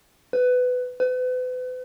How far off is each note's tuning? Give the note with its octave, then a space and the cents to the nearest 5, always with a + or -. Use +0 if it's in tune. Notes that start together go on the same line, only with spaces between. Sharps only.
B4 +15
B4 +40